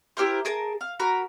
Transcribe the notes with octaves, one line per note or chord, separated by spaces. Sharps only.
E4 G4 A#4 C5
G#4 A#4 A5
F5
F#4 A#4 A#5 B5